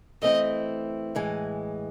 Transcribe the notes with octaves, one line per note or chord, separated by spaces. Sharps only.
E3 A3 C4 E4 D#5
A2 E3 G#3